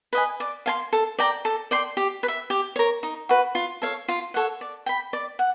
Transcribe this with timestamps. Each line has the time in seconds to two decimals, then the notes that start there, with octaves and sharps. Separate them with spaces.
0.13 B4 D#5 G#5
0.40 D5
0.66 F5 G#5 C6
0.93 A4
1.19 D5 G5 A#5
1.45 A4
1.71 D5 G5 C6
1.97 G4
2.23 B4
2.28 E5
2.50 G4
2.76 A#4 C#5
3.03 D#4
3.29 F#4 B4
3.55 F4
3.82 A4 C#5 F5
4.08 F4
4.34 A4 C#5 F#5
4.61 D5
4.86 G5 B5
5.13 D5
5.39 F#5